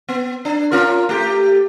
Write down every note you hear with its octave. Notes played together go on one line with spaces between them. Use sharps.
B3
D4
C#4 F4 A#4
A3 G4